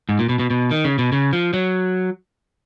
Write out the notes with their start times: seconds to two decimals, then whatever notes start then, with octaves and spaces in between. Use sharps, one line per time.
0.09 G#2
0.19 A#2
0.29 B2
0.39 B2
0.50 B2
0.71 D#3
0.85 C#3
0.99 B2
1.12 C#3
1.33 F3
1.54 F#3